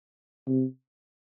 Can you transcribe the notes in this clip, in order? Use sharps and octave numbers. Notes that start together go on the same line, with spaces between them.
C3